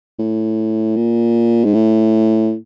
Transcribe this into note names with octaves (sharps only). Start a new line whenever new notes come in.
A2
A#2
G#2
A2